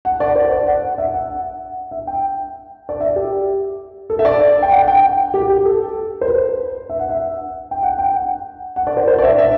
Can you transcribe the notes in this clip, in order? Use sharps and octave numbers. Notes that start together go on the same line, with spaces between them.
F#5
D5
C5
D5
F#5
F#5
E5
F#5
F#5
E5
G5
D5
E5
G4
A4
E5
D5
G5
F#5
G5
G4
G4
A4
C5
B4
E5
F#5
E5
G5
F#5
G5
F#5
F#5
D5
C5
C5
D5
E5
E5